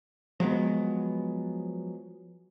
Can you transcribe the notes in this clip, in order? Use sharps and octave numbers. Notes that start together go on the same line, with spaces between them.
F3 F#3 G#3 B3